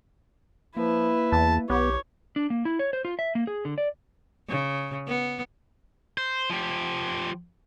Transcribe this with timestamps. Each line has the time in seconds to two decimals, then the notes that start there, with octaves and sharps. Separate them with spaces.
0.77 F3 A#3 E4 B4
1.32 E2 A5
1.70 B1 B3 G4 C#5
2.36 D4
2.50 A#3
2.65 E4
2.79 C#5
2.93 C5
3.05 F4
3.19 E5
3.35 A#3
3.47 G#4
3.65 D3
3.78 D5
4.49 C#3
5.07 B3
6.18 C5
6.50 F3 G4